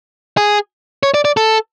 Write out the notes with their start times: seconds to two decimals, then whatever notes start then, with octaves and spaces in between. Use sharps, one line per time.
0.37 G#4
1.03 C#5
1.14 D5
1.25 D5
1.37 A4